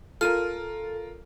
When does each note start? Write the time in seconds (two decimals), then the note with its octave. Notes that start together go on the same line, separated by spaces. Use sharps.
0.21 F4 A4 A#4 F6 D#7